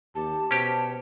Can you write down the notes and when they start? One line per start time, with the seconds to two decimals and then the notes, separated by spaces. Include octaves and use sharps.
0.15 D#2 G4 A5
0.51 B2 C#4 G4 C5